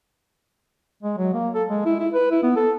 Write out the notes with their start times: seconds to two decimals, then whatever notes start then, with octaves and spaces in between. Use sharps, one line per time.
1.03 G#3
1.18 F#3
1.34 A#3
1.54 A4
1.69 G#3
1.85 E4
2.00 E4
2.14 B4
2.31 E4
2.43 B3
2.56 A4